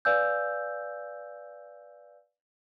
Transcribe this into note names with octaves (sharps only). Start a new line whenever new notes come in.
B4 D5 F5 G#5 E6 G6